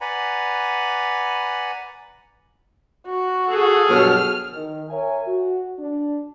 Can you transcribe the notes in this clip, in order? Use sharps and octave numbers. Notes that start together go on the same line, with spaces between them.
B4 D5 F#5 G#5 A#5 B5
F#4
G#4 A4
G2 B2 F#3 F6
D#3
A#4 C#5 E5 G#5
F#4
D4